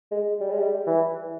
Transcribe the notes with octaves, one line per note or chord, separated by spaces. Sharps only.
G#3
G3
G#3
G3
E3